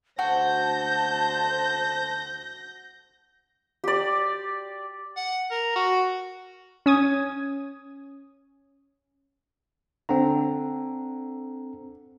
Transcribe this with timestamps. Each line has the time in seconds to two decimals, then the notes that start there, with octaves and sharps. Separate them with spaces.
0.19 D2 F#4 C5 A5 G6 A#6
3.84 G4 D5
5.17 F#5
5.51 A#4
5.76 F#4
6.86 C#4 D#6 G#6
10.09 D3 C4 A#5